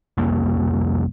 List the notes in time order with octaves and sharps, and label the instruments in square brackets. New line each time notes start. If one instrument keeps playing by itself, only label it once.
[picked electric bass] C2 F2 A#3